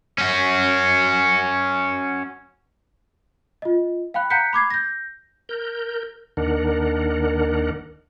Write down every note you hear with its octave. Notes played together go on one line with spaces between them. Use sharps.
C#4 F#4
F4 D#5
F5 G5 B5 F#6
F#5 A#5 F#6 G6 B6 C#7
B5 D6 G#6 C7
G6 A#6
A#4 G6
D#2 D#3 D4 A#4 F#5